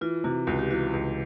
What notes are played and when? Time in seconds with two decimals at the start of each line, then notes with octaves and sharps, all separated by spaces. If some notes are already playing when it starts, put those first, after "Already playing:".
0.01 E3 F4
0.24 C3 F#4
0.47 C#2 F#4
0.59 G4
0.70 E3 F#4
0.93 C#2